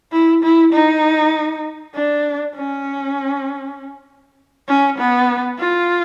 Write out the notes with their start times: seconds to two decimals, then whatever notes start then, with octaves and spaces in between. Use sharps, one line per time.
0.12 E4
0.43 E4
0.73 D#4
1.95 D4
2.56 C#4
4.68 C#4
4.98 B3
5.59 F4